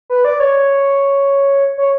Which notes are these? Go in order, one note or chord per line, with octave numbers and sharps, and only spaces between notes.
B4
D5
C#5
C#5